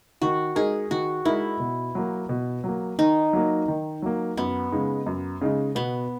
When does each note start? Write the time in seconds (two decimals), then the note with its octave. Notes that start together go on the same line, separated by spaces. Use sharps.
0.22 D#3 F#4
0.55 G#3 D#4 G#4 A#4
0.90 D#3 F#4
1.25 G#3 D#4 E4 A#4
1.60 B2
1.95 F#3 A#3
2.29 B2
2.64 F#3 A#3
2.98 D#3 D#4
3.33 F#3 A#3
3.68 D#3
4.02 F#3 A#3
4.37 F#2 B3
4.72 C#3 G#3 D#4
5.06 F#2
5.41 C#3 G#3 D#4
5.75 B2 B3